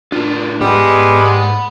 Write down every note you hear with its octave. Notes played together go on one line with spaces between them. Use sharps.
A2 D4 F4
G#2 G3 G#3 B3
F#5 B5